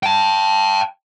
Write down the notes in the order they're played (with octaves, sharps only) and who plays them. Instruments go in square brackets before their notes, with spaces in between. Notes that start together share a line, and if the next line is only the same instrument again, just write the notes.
[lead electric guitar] G5 A5